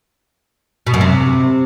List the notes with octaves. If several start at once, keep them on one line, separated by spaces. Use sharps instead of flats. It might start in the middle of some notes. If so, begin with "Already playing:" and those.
B2
F#2
C3